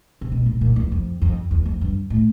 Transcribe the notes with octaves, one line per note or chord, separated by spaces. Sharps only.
C3
B2
A#2
A#2
E2
F2
F2
E2
F2
G2
A2